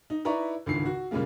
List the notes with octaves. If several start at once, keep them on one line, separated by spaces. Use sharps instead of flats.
D#4
D#4 E4 B4 D5 A#5 C#6
G#1 C#2 D3 D#3 C7
F#4
A#2 C#3 G3 G#3 A#3